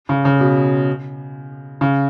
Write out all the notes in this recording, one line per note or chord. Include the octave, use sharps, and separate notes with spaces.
C#3
C#3
B2
C#3